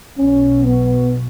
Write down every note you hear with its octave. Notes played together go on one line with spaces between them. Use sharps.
B1 B2 C#4
B3